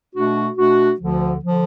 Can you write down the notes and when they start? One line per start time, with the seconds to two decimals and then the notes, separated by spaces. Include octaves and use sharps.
0.14 B2 A3 D4 F#4
0.57 B2 A3 D4 F#4
1.00 D2 D3 F3
1.43 D3 F3